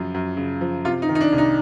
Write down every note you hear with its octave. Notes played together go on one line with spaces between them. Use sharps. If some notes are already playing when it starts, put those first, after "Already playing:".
Already playing: F#2 C#3 F3
F#2
C#3
F3
C3 F4
D#4
D#3
D#4
D4
C2
D#4